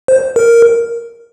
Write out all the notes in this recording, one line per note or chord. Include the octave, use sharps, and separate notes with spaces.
C5
A#4